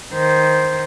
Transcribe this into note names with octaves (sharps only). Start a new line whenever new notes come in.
D#3 C5